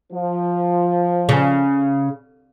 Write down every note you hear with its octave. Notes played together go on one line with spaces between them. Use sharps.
F3
C#3